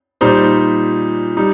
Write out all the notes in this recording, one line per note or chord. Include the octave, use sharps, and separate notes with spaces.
A#2 G3 D#4 C5
G3 D#4